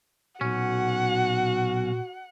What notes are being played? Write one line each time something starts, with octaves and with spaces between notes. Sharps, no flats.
B1 A#2 C#4 F#4 F#5